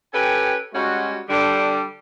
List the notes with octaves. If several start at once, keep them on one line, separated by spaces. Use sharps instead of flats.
C#4 G4 A4 B4 G5 G#5
G3 G#3 C#4 F#4
D3 G3 D4